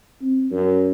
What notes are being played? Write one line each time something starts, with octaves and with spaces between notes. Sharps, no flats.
C4
F#2